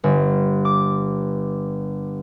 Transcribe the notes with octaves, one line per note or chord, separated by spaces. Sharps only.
G1
D6